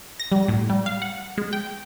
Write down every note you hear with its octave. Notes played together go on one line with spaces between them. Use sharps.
A#6
G3
A2
G3
F5
F#5
G#3
G5